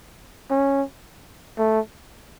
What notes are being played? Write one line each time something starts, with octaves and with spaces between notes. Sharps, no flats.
C#4
A3